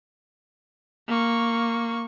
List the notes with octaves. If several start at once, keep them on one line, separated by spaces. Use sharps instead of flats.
A#3 C#6